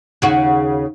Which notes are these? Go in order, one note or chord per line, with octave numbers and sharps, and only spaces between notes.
D#2 C#3 F#4